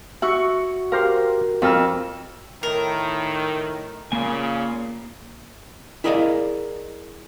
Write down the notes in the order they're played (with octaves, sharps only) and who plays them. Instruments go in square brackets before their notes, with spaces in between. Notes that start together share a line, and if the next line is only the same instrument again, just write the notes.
[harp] F#4 C#6 [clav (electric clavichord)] E5
[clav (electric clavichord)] G4 C5 F5 [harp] A#4
[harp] F2 E6 F6 [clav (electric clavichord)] F4 A4 A#4
[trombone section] A2 D#3 [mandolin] A#4
[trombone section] A#2 C#3 [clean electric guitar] A#3 G#5
[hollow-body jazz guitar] E4 G#4 A#4 D5 D#5 F5